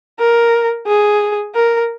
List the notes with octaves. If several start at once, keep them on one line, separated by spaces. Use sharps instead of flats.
A#4
G#4
A#4